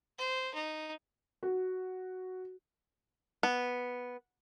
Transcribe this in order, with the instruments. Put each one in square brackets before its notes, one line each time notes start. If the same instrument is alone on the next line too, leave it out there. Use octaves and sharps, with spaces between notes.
[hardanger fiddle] C5
D#4
[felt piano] F#4
[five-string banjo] B3